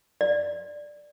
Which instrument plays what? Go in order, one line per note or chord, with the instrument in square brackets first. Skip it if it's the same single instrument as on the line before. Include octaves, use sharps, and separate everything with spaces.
[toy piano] D5